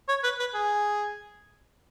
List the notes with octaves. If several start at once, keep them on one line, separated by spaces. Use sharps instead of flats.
C#5
B4
B4
G#4